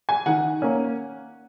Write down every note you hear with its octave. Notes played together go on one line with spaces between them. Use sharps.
G#5
D#3 F#5
A#3 C#4